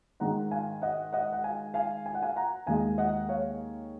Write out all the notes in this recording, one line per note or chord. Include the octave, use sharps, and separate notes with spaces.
G#2 D#3 G#3 F#5 A#5
F5 G#5
D#5 F#5
D#5 F#5
F#5
F5 G#5
F5 G#5
G#5
F#5
F5 G#5
F#5 A#5
D#2 D#3 G#3 F5 G#5
D#5 F#5
C#5 F5